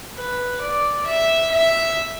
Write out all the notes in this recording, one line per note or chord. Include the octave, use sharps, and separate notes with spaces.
B4
D5
E5
E5